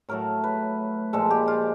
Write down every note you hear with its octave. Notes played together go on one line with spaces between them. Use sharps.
A2 F#3 A3 A#4
B4
A#2 F3 G#3 A4
G4
F4